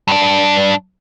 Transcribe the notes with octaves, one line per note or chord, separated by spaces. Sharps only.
G2 D4